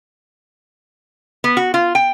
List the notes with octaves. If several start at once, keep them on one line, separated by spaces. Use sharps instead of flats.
B3
F#4
F4
G5